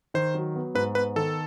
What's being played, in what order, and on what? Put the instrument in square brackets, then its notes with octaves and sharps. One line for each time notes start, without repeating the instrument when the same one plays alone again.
[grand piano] D#3 [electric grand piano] C5
[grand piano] F#3
B3
[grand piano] G#2 [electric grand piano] B4
[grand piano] B3 [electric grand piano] B4
[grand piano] D#3 [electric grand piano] A4